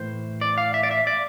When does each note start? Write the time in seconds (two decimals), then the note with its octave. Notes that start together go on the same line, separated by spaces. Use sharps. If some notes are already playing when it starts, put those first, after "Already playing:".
Already playing: A2 E3 C5
0.41 D5
0.58 F5
0.74 E5
0.83 D5
0.91 E5
1.07 D5